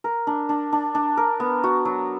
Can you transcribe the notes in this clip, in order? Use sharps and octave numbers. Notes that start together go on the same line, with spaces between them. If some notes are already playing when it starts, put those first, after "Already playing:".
A#4
D4
D4
D4
D4
A#4
B3
F#4
F#3